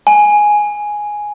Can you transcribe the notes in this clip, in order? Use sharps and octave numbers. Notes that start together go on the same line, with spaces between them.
G#5